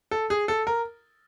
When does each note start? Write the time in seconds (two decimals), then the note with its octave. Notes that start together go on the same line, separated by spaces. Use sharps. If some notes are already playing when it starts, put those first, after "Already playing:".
0.11 A4
0.30 G#4
0.48 A4
0.67 A#4